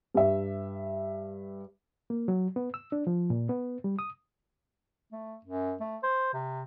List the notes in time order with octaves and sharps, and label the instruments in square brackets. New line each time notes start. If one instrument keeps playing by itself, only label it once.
[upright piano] G2 E5
[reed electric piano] A#3
F#3
B3
E6
D4
F3
A#2
B3
G3
D#6
[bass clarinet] A3
F#2
A3
C5
C3